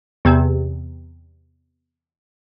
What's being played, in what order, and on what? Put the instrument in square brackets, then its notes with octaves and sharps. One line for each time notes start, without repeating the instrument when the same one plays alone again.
[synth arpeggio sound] E2 C3